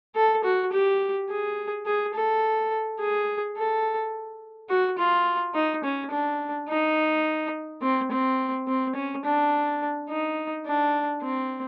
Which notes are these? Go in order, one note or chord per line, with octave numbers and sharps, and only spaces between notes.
A4
F#4
G4
G#4
G#4
A4
G#4
A4
F#4
F4
D#4
C#4
D4
D#4
C4
C4
C4
C#4
D4
D#4
D4
C4